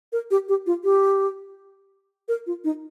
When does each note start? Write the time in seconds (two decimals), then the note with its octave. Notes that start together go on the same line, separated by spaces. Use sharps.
0.12 A#4
0.31 G4
0.49 G4
0.67 F4
0.84 G4
2.28 A#4
2.47 F4
2.64 D#4